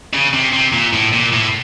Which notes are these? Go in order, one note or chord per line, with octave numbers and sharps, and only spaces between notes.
C#3
C3
C3
A#2
A2
A#2
A2